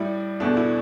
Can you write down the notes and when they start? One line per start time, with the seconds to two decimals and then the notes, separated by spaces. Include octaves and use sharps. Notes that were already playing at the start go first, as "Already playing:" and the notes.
Already playing: A2 G3 E4 D5
0.40 E2 B2 A3 D4
0.57 E4